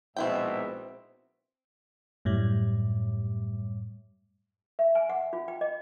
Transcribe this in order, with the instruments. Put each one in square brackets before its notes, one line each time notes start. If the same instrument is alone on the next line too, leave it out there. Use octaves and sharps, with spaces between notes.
[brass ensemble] A#1 G#2 E5 [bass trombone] B2 [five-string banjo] C4 E4 G5
[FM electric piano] F#2 A2 G3
[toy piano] E5
G#5
F#5
F4
G5
D#5